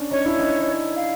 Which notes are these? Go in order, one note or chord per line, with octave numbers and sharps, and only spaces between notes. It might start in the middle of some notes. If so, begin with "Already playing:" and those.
Already playing: C#4 D4
C#4 D#4 C#5
D4 E4
C#4 D#4
F5